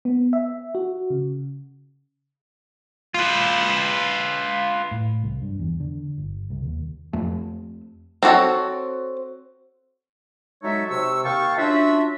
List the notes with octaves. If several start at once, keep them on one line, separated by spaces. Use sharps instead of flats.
B3
E5
F#4
C#3
F4 B4
A2
C2
G2
E2
D3
G1
C2
D#2
F2 A3
C4 D4 F#4 A4 C#5
F#3 G#3 D#4 A4 C#5 E5
C3 C#6 E6
D#2 F5 G5 A5 C#6
C#4 D4 F4 F#4 E5